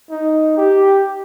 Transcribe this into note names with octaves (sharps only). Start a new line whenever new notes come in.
D#4
G4